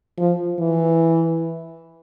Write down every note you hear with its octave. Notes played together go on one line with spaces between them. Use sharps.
F3
E3